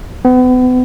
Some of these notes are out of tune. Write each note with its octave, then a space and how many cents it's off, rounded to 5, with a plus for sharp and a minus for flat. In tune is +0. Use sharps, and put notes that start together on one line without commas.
B3 +35